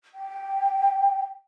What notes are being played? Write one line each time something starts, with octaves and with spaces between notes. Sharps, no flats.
G5